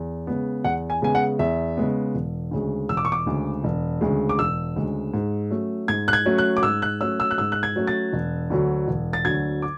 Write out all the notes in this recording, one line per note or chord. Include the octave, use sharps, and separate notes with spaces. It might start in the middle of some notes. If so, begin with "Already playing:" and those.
Already playing: E2
C#3 G#3 B3
E2 F#5
G#5
C#3 G#3 B3 G#5
F#5
E2 E5
C#3 G#3 B3
E1
D2 C#3 G#3
E1 E6
D6
C#6
D6
D2 C#3 G#3
E1
D2 C#3 G#3
D6
E1 E6
D2 C#3 G#3
G#2
F#3 A3 C#4
G#2 G#6
F#6
G#6
F#3 A3 C#4
F#6
D6
G#2 E6
F#6
F#3 A3 C#4 E6
E6
F#6
G#2 E6
F#6
G#6
F#3 A3 C#4
A6
E1
D2 D3 F#3
E1
A6
D2 D3 F#3 G#6
D6